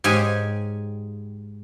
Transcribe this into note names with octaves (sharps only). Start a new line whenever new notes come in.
G#2 G4 G#4 C#5 G#5